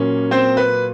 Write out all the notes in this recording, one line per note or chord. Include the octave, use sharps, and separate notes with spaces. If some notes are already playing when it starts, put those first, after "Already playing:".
Already playing: A#2 F#3 A#3 C#4
C4 C5
B4